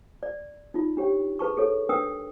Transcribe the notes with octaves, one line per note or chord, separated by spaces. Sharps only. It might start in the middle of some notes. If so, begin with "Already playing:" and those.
D5
D#4 F4
D4 G4 C#5 G5
G#4 B4 A5 C#6
G#4 A4 C#5
D4 A#4 B4 G5 D#6 E6